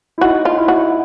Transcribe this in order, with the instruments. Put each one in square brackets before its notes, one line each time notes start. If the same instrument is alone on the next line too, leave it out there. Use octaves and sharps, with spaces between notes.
[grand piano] E4
[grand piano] D#4 [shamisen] F#4
[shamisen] F4
[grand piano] E4
[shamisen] F#4